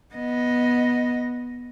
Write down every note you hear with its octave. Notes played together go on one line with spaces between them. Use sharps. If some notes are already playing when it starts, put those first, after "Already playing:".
B3 D#5